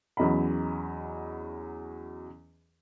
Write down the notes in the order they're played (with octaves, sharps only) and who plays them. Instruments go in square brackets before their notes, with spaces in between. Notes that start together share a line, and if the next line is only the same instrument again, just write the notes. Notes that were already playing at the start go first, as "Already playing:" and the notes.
[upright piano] E2 F#3 C#4 D#5 A#5 B5